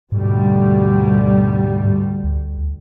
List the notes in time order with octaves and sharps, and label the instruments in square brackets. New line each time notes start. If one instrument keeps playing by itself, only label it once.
[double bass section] D2 B2 G3 [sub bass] G#2
[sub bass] D2